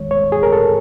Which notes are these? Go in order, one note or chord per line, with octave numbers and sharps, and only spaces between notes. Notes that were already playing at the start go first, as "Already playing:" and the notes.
Already playing: D#2 D#3 G#3 C#5
C#5
G#4
A#4
A4